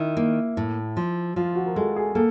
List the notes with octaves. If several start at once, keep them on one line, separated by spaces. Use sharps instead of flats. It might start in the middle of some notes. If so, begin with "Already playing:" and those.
Already playing: D#3 E4
A#3
A2
F3
F3 F4
F#4
A#4
G#3 A4
G#4
A#3 A4